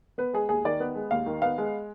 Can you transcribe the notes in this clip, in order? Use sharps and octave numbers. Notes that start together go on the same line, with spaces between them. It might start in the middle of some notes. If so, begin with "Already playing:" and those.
B3 B4
G#3 G#4
D#2 G#4
D#3 D5
B3
G#3
D#2 F5
D#3
B3 F5
G#3